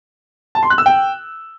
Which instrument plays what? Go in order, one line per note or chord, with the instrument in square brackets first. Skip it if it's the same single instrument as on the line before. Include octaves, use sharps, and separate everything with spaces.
[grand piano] A5
C6
F#6
E6
G5